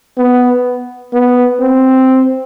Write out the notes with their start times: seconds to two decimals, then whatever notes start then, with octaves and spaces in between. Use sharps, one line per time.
0.18 B3
1.13 B3
1.60 C4